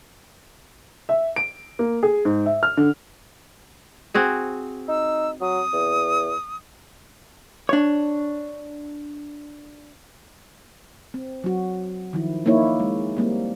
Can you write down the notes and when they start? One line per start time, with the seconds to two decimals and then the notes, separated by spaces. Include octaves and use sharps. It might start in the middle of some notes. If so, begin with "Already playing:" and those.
1.09 E5
1.36 D7
1.79 A#3
2.03 G#4
2.25 G#2
2.46 E5
2.63 F6
2.77 D3
4.14 C4 F#4 G#4
4.88 D#4 E6
5.41 F#3 D#6
5.73 E2
7.69 D4 C#5
11.14 C4
11.44 F#3 F#4
12.13 D#3 F3 E4
12.46 A#3 D#4 E4 C#5
12.80 G#3
13.17 G3 A#3 C4